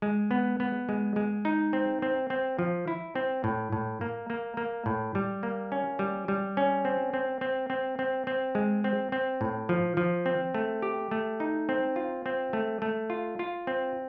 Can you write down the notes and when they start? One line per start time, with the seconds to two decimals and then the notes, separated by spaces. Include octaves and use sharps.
0.02 G#3
0.31 B3
0.60 B3
0.89 G#3
1.16 G#3
1.45 D#4
1.73 C4
2.02 C4
2.30 C4
2.59 F3
2.88 E4
3.15 C4
3.44 A2
3.72 A2
4.01 A#3
4.30 A#3
4.57 A#3
4.86 A2
5.15 G3
5.43 A#3
5.72 C#4
5.99 G3
6.28 G3
6.57 C#4
6.85 C4
7.14 C4
7.41 C4
7.70 C4
7.99 C4
8.27 C4
8.55 G#3
8.84 C4
9.12 C4
9.41 A2
9.69 F3
9.97 F3
10.26 C4
10.54 A3
10.82 G4
11.11 A3
11.40 D#4
11.69 C4
11.96 F4
12.26 C4
12.53 A3
12.82 A3
13.10 F4
13.39 F4
13.67 C4